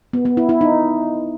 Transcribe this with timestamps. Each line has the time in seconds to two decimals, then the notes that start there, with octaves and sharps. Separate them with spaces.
0.13 B3
0.25 B3
0.37 E4
0.49 E4
0.61 D#4